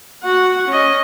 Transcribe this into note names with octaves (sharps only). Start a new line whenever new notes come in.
F#4 F#5
C#4 D#5